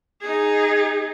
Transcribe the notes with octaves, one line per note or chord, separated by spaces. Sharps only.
D#4 G#4